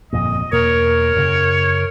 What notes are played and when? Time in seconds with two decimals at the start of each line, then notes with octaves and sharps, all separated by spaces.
0.13 G1 F2 A#2 D#5
0.52 E2 B2 A#3 A#4 C#5
1.16 F#2 C#3